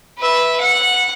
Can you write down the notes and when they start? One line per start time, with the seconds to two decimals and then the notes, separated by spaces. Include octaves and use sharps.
0.18 B4 E5
0.60 F#5